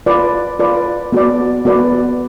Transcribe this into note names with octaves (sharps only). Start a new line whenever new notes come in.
F4 B4 D5
F4 B4 D5
B3 F#4 B4 D5
B3 F#4 B4 D5